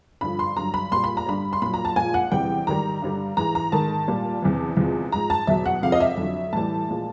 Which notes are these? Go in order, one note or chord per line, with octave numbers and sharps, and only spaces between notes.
G2 D3 F3 B5
C6
G2 D3 F#3 A#5
B5
A#2 G3 C6
B5
A#5
G2 D3 G3 B5
C6
A#2 F#3 B5
A#5
A5
A#2 F3 G#3 G#5
F#5
E2 C3 E3 G3 G5
G#2 D#3 G3 A#5
G2 D3 G3
G#2 E3 G#3 A#5
A#5
G#2 D#3 G#3 A5
A#2 G3
E2 C3 E3
E2 C3 F3 G#3
G#2 F3 G#3 A#5
A5
E2 B2 F#3 E5
F#5
F2 C3 F3 G#3 F5
D#5
E5
F2 D3 F#3
A2 E3 G3 A5
A#2 F3 G#3